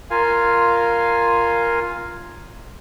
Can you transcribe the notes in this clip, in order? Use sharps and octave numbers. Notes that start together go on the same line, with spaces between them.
F4 A#4 F5 G#5